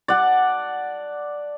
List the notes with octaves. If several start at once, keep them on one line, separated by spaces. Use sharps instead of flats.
D5 F#5 A5